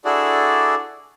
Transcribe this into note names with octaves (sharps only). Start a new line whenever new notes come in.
D4 E4 F#4 G#4 A4 D5